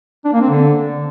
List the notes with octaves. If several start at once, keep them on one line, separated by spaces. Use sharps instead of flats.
D4
A#3
C4
D3